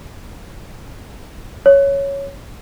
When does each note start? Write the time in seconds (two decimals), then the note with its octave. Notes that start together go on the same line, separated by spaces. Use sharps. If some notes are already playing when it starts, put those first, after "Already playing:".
1.66 C#5